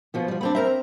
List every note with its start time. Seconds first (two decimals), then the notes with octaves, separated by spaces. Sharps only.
0.14 B2 F3 B3
0.28 B2 F3 G3
0.41 B3 C4 D4 B5 C6
0.55 C4 A#4 C5 E5 A#5